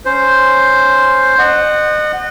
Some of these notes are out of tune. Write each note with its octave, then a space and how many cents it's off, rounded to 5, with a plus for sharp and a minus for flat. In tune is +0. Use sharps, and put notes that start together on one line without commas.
C#4 +0 C5 +0
D#5 -35 F#5 +0